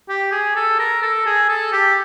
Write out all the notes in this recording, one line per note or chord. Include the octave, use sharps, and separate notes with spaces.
G4
G#4
A4
A#4
A4
G#4
A4
G4